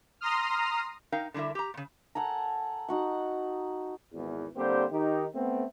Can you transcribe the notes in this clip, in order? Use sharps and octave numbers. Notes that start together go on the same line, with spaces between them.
A#5 C6 D#6 F6
D#4 A#4 F5 G5
D3 G3 E4 A#4 E5
G4 A#5
A#2 C#3
A4 F#5 G#5 A#5
D#4 F#4 F#5
G#1 E2
D3 G3 A#3 C4 G4 C5
D#3 D#4 G4
A3 B3 C4